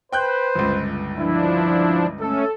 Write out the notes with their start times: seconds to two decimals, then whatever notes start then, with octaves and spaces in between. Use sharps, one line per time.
0.13 B4 C5 G5 F#6 G6
0.55 G1 C#2
1.18 F3 D4 E4
2.20 A3 C#4 A4